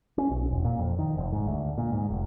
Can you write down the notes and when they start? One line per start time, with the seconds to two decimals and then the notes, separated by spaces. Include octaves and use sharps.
0.18 C#4
0.31 B1
0.51 E1
0.64 A#2
0.79 F2
0.99 D#3
1.17 F1
1.33 G#2
1.47 D2
1.78 A#2
1.92 G#2
2.10 F1